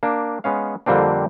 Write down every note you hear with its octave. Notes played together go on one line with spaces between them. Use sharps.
A#3 D4
G#3 B3 C#4 F5
F2 D3 G3 A#3 C4 D4